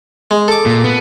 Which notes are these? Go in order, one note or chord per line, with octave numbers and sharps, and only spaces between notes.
G#3
A4 D6
A#2
B3